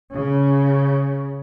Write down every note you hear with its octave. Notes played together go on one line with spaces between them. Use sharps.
C#3